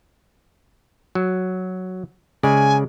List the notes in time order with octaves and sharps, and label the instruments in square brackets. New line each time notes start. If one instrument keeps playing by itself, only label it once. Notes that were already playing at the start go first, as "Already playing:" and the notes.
[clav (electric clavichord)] F#3
[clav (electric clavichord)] C#3 G#3 D5 [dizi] G#5